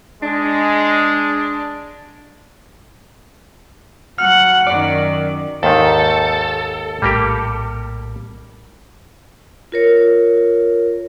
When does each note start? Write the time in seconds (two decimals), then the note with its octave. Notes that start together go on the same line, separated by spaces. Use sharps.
0.23 G#3 D4
4.18 F#3 F#5 F6
4.67 F#2 D#3 D5
5.63 D#2 G#2 D#3 A4
7.02 A#1 A2 G3 A#3 G4
9.72 F4 A#4 C#5